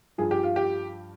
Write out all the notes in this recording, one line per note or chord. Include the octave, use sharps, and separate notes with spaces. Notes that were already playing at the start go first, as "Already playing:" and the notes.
G2 F3 G#4
G4
F4
G4